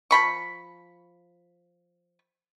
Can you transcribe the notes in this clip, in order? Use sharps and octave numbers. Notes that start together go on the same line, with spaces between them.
F3 B5 C#6